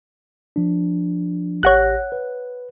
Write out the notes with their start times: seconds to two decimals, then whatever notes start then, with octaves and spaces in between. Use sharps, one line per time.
0.56 F3 D4
1.63 A1 G4 C#5 F#5 F#6 A#6
2.12 B4